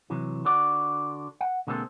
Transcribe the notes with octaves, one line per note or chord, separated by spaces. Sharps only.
C3 E3 F#3
D3 D4 F#4 D5
F#5
B2 D3 G#3 A#3 C4 A4